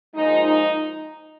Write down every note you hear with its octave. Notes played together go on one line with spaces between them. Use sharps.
A#2 F3 G#3 D#4
D#4